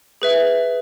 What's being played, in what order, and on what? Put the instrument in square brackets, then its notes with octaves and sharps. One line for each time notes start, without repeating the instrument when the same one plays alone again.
[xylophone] G#4 B4 E5